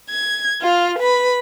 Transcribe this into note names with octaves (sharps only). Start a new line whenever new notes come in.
G#6
F4 F5
B4 B5